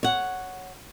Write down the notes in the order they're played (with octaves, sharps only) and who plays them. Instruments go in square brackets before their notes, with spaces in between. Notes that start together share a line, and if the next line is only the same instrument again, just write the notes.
[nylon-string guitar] C#5 F#5